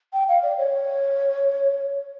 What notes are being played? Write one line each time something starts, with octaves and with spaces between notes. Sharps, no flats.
G5
F5
D5
C#5